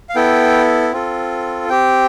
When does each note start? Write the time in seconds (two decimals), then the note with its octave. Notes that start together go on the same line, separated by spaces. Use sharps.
0.09 F5
0.15 B3 E4 A4 G5
0.92 C4 F4 A4
1.69 C4 G4 G5